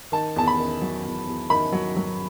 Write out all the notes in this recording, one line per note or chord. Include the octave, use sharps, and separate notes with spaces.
D#3 A5
E2 A5
B5
D#3
F#3
E2
E2
D#3 B5
F#3
F#3